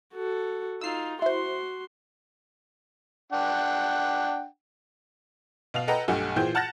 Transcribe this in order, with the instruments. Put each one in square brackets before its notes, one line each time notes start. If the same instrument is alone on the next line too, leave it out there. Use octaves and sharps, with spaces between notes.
[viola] F#4 A4
[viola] D#4 F4 [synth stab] E6 C7
[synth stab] E4 C5 [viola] F#4 C6
[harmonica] D4 F#5 G5
[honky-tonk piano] B2 F5 F7
A4 B4 D#5 F#5 G5 A#5
B1 G2 A3 G4 F#5 G#5
A#2 E3 G#4 C5 G5 G6
F#5 A5 F6 F#6 A6 A#6